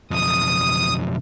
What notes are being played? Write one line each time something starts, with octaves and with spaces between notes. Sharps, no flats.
B1 F2 D#6